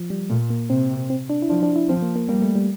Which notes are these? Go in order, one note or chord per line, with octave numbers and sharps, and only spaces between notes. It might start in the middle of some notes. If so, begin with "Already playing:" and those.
Already playing: F3
G3
A#2 A3
A#3
C3 C4
C4
D4
E4
F3 D4
D4
E4
F3 C4
A#3
A#3
G3 A#3
A3
G3